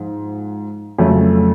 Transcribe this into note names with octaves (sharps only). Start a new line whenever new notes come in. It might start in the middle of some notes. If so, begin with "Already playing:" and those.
Already playing: G#2 F3
F2 C#3 F#3 A3 C#4